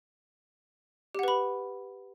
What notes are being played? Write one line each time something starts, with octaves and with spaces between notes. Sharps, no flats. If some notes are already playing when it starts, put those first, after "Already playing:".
G4 B4 F#5 B5